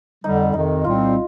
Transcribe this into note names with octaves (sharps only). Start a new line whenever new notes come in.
F2 D3 G3 D#4
F2 C3 D#3 D#4
C2 A#2 G3 C4 F4